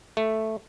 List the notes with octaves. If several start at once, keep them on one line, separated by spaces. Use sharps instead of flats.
A3